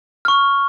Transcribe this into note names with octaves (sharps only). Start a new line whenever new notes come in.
C#6 F6